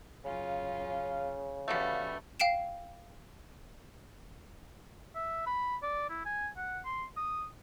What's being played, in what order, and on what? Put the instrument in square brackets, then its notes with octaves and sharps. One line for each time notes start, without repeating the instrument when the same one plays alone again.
[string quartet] F#2 C#4 F4 [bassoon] C#3 [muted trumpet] F5
[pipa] B2 D3 A3 [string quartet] E3 G3 C#4 [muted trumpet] F5
[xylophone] F5 G5 C7 D7 E7
[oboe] E5
B5
D5
E4
G#5
F#5
C6
D#6